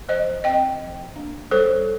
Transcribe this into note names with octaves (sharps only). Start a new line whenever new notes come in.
F3 C5 D#5
C4 D#5 G5
F3
A#3 D4
G3 A4 C5